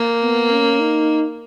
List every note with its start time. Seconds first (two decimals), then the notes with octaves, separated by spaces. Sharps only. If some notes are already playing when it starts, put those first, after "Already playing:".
Already playing: A#3
0.23 B3
0.52 C#4
0.80 D#4